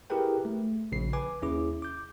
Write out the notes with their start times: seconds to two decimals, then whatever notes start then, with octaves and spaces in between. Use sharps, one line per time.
0.10 E4 G4 G#4 A#4 B4 G5
0.45 A3
0.92 A#1 C#3 C7
1.13 B4 G#5 D6
1.42 D#2 C#4 E4 G#4 D6
1.82 D6 G6